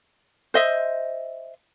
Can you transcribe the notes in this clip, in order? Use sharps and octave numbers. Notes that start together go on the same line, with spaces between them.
C5 D#5 E5